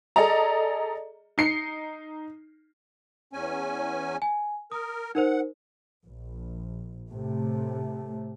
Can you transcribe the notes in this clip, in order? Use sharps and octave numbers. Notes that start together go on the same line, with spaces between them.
G#4 A4 D5 D#5 A#5
D#4 C7 C#7
E2 C#4 G#5
G#5
A#4 D#6
D#4 A#4 C5 F#5
A#1
A2 C3 A3